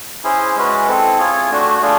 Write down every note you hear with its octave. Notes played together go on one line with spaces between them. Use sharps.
C#4 E4 G#4 C5
G#3 C#4 F#4 B4
C4 E4 A4
F4 G#4 C#5
A3 D4 F#4
A3 D4 F4 G#4